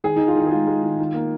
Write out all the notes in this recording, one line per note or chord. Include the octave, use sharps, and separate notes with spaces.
D#3 G#4
D#3 D#4
F4
D#3 D#4
G#4
G#3 F4
G#3
D#3
D#3
A#3